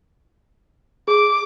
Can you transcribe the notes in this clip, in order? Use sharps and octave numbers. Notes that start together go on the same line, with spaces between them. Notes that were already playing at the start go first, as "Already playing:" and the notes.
G#4 D6